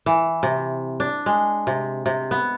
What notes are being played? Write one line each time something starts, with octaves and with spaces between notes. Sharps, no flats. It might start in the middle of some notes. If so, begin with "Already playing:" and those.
E3
C3
D4
G#3
C3
C3
B3